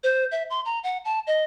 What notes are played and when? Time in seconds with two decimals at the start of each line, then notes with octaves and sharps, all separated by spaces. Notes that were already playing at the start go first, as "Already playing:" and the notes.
0.03 C5
0.32 E5
0.50 C6
0.65 A#5
0.84 F#5
1.05 A5
1.27 D#5